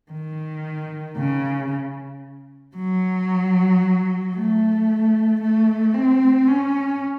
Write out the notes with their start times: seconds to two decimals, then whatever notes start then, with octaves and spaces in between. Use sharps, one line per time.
0.12 D#3
1.17 C#3
2.76 F#3
4.35 A3
5.41 A3
5.94 C4
6.47 C#4